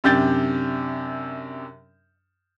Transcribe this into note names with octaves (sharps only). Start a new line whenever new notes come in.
F#2 C3 D4 G4 G6 A6